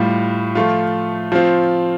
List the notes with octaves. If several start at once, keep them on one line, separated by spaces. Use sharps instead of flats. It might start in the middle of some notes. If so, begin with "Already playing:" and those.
Already playing: A2 G3 F4
F3 A3 F4
F3 C4 F4